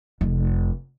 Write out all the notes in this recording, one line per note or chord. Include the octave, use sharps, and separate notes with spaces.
F1 F2